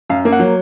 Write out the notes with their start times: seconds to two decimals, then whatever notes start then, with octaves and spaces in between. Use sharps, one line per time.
0.10 F#2 F5
0.25 A#3
0.32 F#5
0.39 F#3